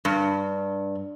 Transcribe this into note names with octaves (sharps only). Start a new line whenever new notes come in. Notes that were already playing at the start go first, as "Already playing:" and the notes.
G2